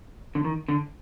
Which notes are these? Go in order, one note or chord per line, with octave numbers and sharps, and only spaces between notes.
D3
D#3
D3